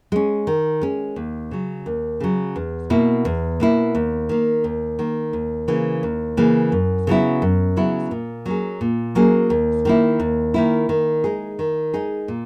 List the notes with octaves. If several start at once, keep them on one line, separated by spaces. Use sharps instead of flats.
G#3 C#4
D#3
G#3 C#4
D#2
C#3 F#3
D#2
C#3 F#3
E2
B2 A#3 E4
E2
B2 A#3 E4
D#2
D#3 A#3
D#2
D#3 A#3
D#2
C#3 E3 A#3
D#2
C#3 E3 A#3
F#2
C#3 F#3 B3 E4
F#2
C#3 F#3 B3 E4
A#2
F#3 A#3 C#4 G#4
A#2
F#3 A#3 C#4 G#4
D#2
D#3 A#3 E4
D#2
D#3 A#3 E4
D#3
G#3 D#4 G#4
D#3
G#3 D#4 G#4
A#2